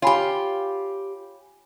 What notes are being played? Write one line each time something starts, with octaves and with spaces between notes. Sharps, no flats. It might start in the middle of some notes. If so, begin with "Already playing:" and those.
F4 G4 C#5 G#5 B5